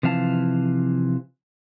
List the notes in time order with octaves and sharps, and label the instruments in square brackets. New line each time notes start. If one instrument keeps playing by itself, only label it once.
[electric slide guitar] C3 E3 F3 F5 A5